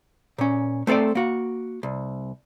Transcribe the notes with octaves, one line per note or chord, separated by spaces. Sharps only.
A#2 C#4
A3 C4 A4 C5 D5
A#3 F#4
C2